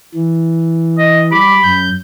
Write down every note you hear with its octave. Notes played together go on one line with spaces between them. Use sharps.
E3
D#5
G3 B5 D6
F#2 G6